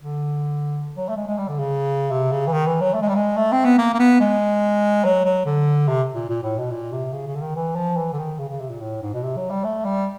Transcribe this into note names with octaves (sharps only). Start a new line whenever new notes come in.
D3
F#3
A3
G#3
G#3
G3
D3
C#3
C3
C#3
E3
D#3
E3
F#3
A3
G#3
G3
G#3
A3
C4
B3
A#3
A#3
B3
G#3
F#3
F#3
D3
C3
A#2
A#2
A2
B2
A#2
C3
C#3
C#3
D3
D#3
E3
F3
E3
D3
D#3
C#3
C#3
C3
A#2
A2
G#2
B2
C3
F#3
G3
A3
G3